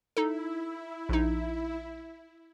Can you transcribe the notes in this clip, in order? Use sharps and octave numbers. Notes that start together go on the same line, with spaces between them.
D#4 E4 A4
A#1 D#4